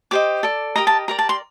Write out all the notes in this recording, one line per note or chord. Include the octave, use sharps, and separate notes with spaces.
G4 C5 D#5 D6
A4 D5
G4 A#4 D#5 A#5
A5
G4 A#4 D5 A#5
A5
C6